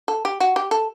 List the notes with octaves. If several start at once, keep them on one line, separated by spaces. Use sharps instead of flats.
A4
G4
F#4
G4
A4